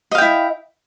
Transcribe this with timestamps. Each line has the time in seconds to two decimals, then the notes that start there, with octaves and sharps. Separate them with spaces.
0.11 D#5
0.15 F5
0.18 G5
0.22 E4